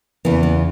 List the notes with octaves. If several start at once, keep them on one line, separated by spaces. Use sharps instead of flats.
E2 C#3 E3 B3
B3